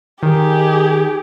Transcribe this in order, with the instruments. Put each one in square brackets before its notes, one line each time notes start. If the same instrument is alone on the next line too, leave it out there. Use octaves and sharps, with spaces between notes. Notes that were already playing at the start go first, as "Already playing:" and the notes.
[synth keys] D#3 [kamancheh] G4 G#4